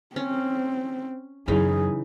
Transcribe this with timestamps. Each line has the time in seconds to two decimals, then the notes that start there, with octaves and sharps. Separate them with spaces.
0.16 C4 C#4
1.48 F#2 C#3 E3 F#3 D#4 G#4